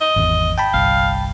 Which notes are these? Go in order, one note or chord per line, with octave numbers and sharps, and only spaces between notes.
D#5
G#1 E2
G5 A5 B5
G1 C2 F5